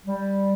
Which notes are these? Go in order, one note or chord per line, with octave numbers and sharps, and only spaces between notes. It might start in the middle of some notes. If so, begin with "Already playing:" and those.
G3